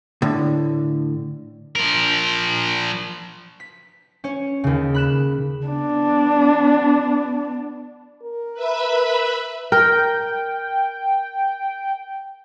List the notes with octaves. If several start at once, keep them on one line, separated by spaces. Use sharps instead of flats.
A2 D3
F3 A#4
B6
C#4 C#5
D#2 C#3
B5 F#6 E7
B3 D4
A#4
B4 E5 B5
A#4 G5